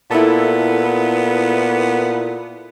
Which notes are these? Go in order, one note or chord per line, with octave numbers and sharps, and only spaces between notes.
A#2 B3 E4 A4